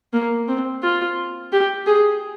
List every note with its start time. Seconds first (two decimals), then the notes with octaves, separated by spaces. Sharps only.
0.13 A#3
0.48 C4
0.83 F4
1.53 G4
1.87 G#4